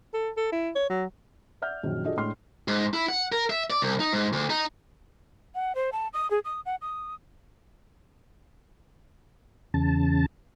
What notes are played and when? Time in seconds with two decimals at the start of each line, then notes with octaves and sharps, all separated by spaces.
0.14 A4
0.37 A4
0.52 E4
0.75 C#5
0.90 F#3
1.62 D5 E5 F#5 F6 G6
1.83 A#1 F#2 D#3
2.05 D4 F4 F#4 G#4 A4 D#5
2.17 A2 G#3 D4 C6 F6
2.68 G#2
2.94 E4
3.09 F#5
3.32 A#4
3.50 E5
3.70 D5
3.82 C2
4.00 D#4
4.13 G#2
4.33 D2
4.50 D#4
5.55 F#5
5.75 C5
5.92 A5
6.13 D#6
6.31 G#4
6.44 D#6
6.66 F#5
6.81 D#6
9.74 E2 C#3 A5